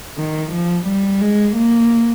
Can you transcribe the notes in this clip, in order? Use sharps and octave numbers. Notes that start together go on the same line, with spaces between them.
D#3
F3
G3
G#3
A#3